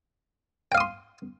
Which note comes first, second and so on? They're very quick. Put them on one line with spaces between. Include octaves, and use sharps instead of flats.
G5 F5 D#6 C6